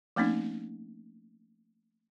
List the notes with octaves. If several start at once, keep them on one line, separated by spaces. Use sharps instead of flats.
F3 A3 A#3 C4 C#4 D#4